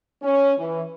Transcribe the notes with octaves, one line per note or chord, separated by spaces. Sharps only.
C#4
E3